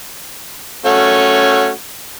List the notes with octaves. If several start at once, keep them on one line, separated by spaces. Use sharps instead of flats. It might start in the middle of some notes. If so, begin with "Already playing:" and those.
A3 C#4 F#4